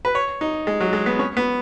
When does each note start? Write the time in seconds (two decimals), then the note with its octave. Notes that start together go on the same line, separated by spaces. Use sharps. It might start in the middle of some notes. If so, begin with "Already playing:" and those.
0.05 B4
0.15 C#5
0.41 D#4
0.67 G#3
0.80 F#3
0.93 G#3
1.06 B3
1.19 C#4
1.37 B3